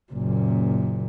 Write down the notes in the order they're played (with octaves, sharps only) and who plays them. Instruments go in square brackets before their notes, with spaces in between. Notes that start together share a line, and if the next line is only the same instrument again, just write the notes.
[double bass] F#1 A#2